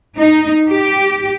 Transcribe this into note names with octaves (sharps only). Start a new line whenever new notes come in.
D#4
G4